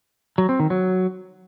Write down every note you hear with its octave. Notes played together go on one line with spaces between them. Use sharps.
F#3
C4
D#3
F#3